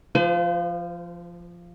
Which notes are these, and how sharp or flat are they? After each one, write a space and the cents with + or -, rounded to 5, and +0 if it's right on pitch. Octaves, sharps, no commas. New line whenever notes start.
F3 -10 C5 -45